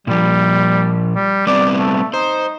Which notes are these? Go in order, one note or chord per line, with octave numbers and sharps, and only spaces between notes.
A#2 F3 G3
G3
G3 B3 C4 D5
A3
D#4 C5